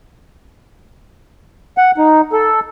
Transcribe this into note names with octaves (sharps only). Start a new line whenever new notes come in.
F#5
D#4
A4